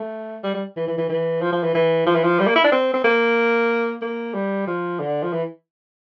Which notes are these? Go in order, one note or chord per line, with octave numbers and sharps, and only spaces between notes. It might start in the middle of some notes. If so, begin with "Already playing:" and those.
Already playing: A3
G3
G3
E3
E3
E3
E3
F3
F3
E3
E3
F3
E3
F3
G3
A#3
E4
D4
C4
C4
A#3
A#3
G3
F3
D3
F3
E3